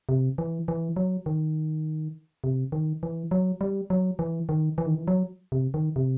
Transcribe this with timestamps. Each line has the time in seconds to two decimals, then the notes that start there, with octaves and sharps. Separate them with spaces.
0.09 C3
0.38 E3
0.68 E3
0.96 F#3
1.26 D#3
2.44 C3
2.72 D#3
3.03 E3
3.31 F#3
3.61 G3
3.90 F#3
4.19 E3
4.49 D#3
4.78 E3
4.86 D#3
4.95 E3
5.08 F#3
5.52 C3
5.74 D#3
5.96 C3